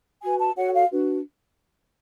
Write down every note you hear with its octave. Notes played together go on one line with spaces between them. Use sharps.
F#4 B4 G#5
A5
F#4 A4 C#5 F#5
F5
D4 F#4 B4